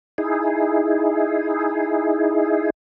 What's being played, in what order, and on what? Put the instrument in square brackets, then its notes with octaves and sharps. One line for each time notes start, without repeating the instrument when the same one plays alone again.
[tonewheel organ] D#4 E4 G#4